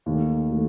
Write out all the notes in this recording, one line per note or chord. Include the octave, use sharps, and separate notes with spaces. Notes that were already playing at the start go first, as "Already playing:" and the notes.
D#2 D#3 A3
D#3 A3